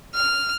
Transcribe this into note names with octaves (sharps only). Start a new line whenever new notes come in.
F6